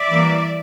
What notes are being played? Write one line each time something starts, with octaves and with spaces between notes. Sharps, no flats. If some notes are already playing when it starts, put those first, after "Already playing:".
Already playing: D5 E5
E3 G3 A#3